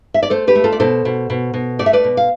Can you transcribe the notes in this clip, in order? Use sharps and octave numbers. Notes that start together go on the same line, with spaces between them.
E5
D5
A3 A4 C5
G4 B4
A3
F4 A4
D5
B2 A4 C5
B2
B2
B2
A3 D5
E5
B4 D5
B2
F5